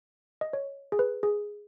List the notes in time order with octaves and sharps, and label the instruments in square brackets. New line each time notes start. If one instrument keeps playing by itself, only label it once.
[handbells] D#5
C#5
G#4
B4
G#4